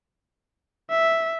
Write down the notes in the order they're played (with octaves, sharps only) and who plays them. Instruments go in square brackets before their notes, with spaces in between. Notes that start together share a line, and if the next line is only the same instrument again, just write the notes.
[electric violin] E5